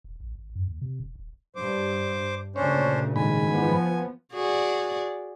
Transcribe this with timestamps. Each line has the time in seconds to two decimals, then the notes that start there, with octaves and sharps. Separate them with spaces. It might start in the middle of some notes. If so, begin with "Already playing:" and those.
0.04 E1
0.20 A1
0.35 G#1
0.55 F#2
0.68 D#2
0.81 C3
1.00 E1
1.15 D#1
1.56 G2 C5 D6
2.56 D2 A#2 C#3 C#4 D4 C5 C#5
3.16 G#2 D#3 G#5 B5
3.49 F3 B3
4.33 F#4 G#4 D5